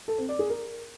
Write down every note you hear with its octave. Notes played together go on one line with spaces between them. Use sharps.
A4
C4
D5
G#4
A#4